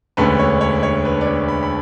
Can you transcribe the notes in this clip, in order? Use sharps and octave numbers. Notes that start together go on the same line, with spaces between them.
E1 D2 D3 A3 C#4 B4
C#5
C#5
C#5
B4
D5
C#5
B5
B5